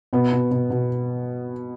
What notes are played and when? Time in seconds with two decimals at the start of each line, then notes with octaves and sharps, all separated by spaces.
0.13 B2 B3
0.33 B2
0.51 B2
0.70 B2